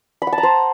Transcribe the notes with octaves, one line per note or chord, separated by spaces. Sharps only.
B5
F#5
A5
A#5
C5